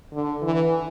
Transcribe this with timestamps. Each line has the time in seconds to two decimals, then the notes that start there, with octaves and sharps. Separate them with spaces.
0.12 D3
0.42 E3